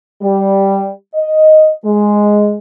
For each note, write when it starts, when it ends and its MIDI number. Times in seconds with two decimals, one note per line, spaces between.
0.22 0.88 55
1.14 1.71 75
1.85 2.56 56